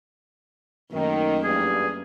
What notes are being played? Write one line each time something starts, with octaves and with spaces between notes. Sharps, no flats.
F#2 D#3 A3 A#3
E2 G2 G#4